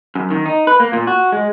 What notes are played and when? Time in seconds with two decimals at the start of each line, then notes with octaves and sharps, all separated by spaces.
0.15 F#2
0.31 D#3
0.45 D#4
0.67 B4
0.80 A#3
0.93 A#2
1.07 F#4
1.32 G#3